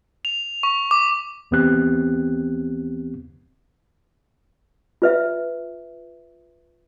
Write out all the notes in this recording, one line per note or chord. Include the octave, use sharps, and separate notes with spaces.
F7
C#6
D6
D#2 E3 B3 C4 G4 F#6
F4 B4 E5